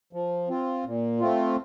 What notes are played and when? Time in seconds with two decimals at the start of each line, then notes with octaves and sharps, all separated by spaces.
0.13 F3
0.48 C4 F4
0.85 A#2
1.20 A3 C4 F4